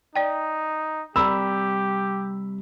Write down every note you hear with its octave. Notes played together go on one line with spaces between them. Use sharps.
D#4 D5 G5
C3 G3 G4 A#4 B5 E6